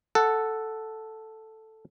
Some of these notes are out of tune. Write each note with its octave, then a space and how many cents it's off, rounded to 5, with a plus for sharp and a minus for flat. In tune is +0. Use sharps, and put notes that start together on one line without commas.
A4 +0 F#5 -5